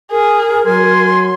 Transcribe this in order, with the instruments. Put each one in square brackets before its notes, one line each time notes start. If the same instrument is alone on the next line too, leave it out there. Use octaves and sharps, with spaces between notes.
[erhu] G#4 [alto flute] A#4
[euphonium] F#3 [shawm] G#5 [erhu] C6